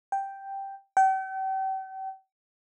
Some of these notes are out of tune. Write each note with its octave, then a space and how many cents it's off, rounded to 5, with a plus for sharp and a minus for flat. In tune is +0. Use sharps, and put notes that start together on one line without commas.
G5 +0
G5 -40